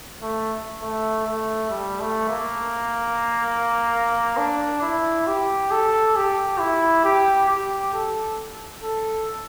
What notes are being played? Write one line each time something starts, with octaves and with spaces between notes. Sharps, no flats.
A3
A3
A3
G3
A3
A#3
D4
E4
G4
A4
G4
E4
G4
G4
A4
A4